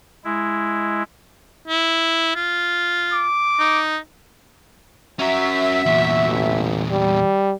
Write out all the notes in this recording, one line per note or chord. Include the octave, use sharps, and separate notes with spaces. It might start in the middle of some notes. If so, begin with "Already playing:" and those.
G#3 E4
E4
F4
D6
D#4
C#4 F#4 A#4 E5
E2 A#2
A1
G3